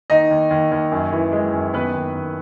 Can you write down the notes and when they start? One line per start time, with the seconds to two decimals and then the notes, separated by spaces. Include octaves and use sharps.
0.10 D#2 D#4 D#5
0.31 D#2
0.51 D#2
0.71 D#2
0.92 F#2
1.13 E3
1.32 G#3
1.54 F#2
1.74 D#2 B3 B4
1.94 D#2
2.15 D#2